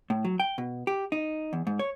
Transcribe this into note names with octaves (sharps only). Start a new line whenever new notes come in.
A2
F#3
G5
B2
G4
D#4
E2
G#2
C#5